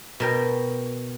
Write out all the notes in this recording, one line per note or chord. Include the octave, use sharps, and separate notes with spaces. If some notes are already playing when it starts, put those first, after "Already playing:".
B2 A#4 G5